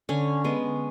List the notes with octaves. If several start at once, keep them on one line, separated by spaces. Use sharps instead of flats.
D3 C#4
G#3 B3